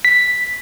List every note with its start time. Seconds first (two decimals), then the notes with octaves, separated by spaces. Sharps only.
0.05 B6